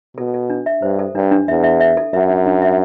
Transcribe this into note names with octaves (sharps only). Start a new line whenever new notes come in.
B2 A4
A4
D4
E5
G2 C5
A4
G2 D4
D4
E2 E5
E5
E5
A4
F#2 E5
D4
D4
E5